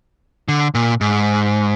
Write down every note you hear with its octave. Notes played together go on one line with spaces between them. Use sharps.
D3
A#2
G#2